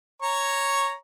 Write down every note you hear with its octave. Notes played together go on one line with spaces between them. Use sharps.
C#5 A#5 C#6